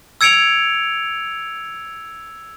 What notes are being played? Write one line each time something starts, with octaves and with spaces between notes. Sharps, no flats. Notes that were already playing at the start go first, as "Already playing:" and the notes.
E6 G#6 C#7 D7 F7